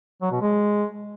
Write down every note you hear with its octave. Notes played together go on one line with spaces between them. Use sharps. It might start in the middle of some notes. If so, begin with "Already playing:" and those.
F#3
B2
G#3